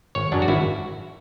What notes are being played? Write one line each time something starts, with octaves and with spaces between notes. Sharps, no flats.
G#1 C#5
F#2 C#3 F#3 D4
F#4
G#1 E4